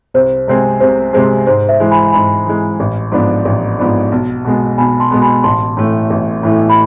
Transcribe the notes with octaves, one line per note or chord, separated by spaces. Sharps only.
C2 C5
C3 G#3 C4 G#4
C2 C5
C3 G#3 C4 G#4 C5
G#2 C5
C5 E5
E3 G#3
G#5 B5
G#2 G#5 B5
E3 G#3
A1
G#2 F3 B3 D4
A1
G#2 F3 B3 D4
B1
B2 G#3 B3
B1 G#5 B5
A5 C6
B2 G#3 B3
G#5 B5
A1 A5 C6
A2 E3 A3
A1
A2 E3 A3
B5